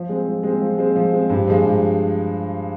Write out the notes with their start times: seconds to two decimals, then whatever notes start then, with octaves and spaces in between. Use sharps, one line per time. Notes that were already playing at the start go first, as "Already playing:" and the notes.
Already playing: F3
0.09 G#3 C4
0.27 F3
0.43 G#3 C4
0.61 F3
0.78 G#3 C4
0.96 F3
1.12 G#3 C4
1.30 G2
1.47 F3 G#3
1.65 G2